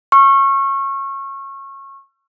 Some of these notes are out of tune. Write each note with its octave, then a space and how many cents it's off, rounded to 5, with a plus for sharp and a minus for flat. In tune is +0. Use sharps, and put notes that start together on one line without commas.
C#6 -20 E6 +45